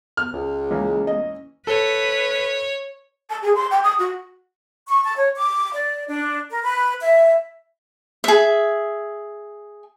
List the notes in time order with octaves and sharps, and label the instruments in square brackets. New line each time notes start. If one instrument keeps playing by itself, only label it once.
[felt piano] F6
[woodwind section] C#2
[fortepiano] E3 A#3 C#4 [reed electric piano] G#3
[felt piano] D#5
[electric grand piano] A4 [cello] B4 [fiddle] C#5
[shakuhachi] A5
G#4
C6
G5
D#6
F#4
[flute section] C#6
A5
C#5
D6
D5
D4
A#4
B4
E5
[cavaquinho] G#4 E5